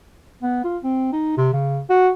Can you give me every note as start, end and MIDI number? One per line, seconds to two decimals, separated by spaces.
0.42 0.61 59
0.64 0.78 65
0.83 1.09 60
1.13 1.34 63
1.37 1.52 48
1.53 1.80 49
1.90 2.10 66